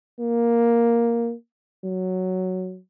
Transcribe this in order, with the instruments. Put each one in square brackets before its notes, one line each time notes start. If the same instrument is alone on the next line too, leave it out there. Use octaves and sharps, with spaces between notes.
[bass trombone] A#3
F#3